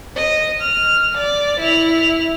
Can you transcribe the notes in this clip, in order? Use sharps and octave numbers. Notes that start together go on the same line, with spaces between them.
D#5
F6
D5
E4 F7